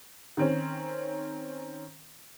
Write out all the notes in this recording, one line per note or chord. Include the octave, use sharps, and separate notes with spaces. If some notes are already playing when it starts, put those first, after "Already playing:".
D#3 C4 C#4